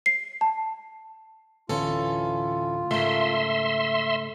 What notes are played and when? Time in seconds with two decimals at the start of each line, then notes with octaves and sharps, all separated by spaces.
0.06 C7
0.41 A5
1.69 D1 D2 E3 C#4 F4 A4
2.91 G#2 C#3 A3 A#4 E5 C6